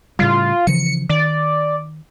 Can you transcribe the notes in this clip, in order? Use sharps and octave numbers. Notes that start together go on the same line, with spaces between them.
A2 C#3 G3 F4
C#3 E3 F3 C#7
D#3 D5